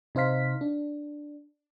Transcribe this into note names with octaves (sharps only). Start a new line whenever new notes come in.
C3 D#4 C5 F5 B6
D4